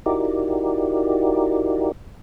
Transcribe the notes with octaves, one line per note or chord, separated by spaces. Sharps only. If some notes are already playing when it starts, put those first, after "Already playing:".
D#4 E4 F#4 G4 A#4 D5